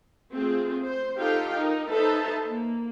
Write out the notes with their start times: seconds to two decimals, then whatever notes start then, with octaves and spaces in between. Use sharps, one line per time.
0.32 A3 C4 F4 G#4
0.83 C5
1.17 D#4 F4 G4 A4 F5 G5
1.54 D#4 A#4
1.90 D#4 A4 B4 C5 E5 A5
2.47 A#3